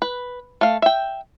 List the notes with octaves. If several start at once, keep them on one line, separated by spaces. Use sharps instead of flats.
B4
A3 F5
E5 G5